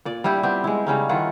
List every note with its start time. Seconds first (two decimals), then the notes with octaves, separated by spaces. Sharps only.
0.05 A#2 D5
0.24 G3 D4 E4 G4
0.43 B3 C4 D4 G4
0.64 G#3 E4
0.86 C#3 G3 C#4 D#4
1.09 D#3 E4 F4 F#5